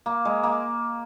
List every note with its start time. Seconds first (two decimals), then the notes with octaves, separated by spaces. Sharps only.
0.06 A#3
0.25 G#3
0.43 A#3